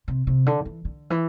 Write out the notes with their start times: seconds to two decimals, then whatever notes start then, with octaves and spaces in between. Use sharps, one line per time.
0.08 C3
0.27 C3
0.46 D3
0.65 E3
0.85 D3
1.10 E3